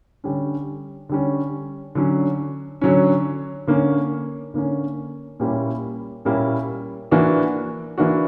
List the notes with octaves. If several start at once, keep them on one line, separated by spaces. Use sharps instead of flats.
D3 G3 C#4
D3 G3 C#4
D3 F#3 C#4
D3 F#3 C#4
D3 A#3 C#4
D3 A#3 C#4
A#2 G3 A#3 C#4 E4
A#2 G3 A#3 C#4 E4
E3 A#3 D4 F#4
E3 A#3 D4 F#4